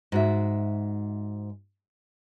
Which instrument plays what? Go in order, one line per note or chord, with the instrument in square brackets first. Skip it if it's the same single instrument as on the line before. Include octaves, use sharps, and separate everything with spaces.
[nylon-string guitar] G#2 F#4 E5